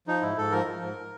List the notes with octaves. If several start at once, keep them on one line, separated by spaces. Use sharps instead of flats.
F3 D#4
G#2 E4
G#2 A4
F3 A#4
F3
G#2